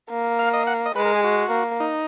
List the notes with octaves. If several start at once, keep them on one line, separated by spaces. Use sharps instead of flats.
A#3
F5
D#5
F#5
D#5
G#3 B4
A#4
G#4
F#4
A#3
D#4